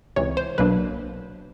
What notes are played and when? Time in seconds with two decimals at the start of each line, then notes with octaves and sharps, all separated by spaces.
0.16 C#2 C3 E3 C#5
0.37 C5
0.58 B1 B2 F#3 A#3 D4 B4